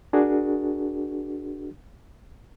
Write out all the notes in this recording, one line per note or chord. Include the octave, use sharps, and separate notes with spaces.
D4 F#4 G#4 A#4